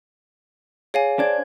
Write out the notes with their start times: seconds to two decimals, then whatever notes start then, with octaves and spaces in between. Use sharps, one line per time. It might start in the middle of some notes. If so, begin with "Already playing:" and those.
0.94 G#4 C#5 F5 G#5
1.19 D4 C5 G#6